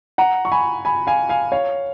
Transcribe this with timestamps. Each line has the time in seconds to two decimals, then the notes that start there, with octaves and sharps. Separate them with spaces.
0.18 F#5 A#5
0.45 C#6
0.52 G#5 B5
0.85 G#5 B5
1.07 F5 G#5
1.29 F5 G#5
1.52 C#5 F5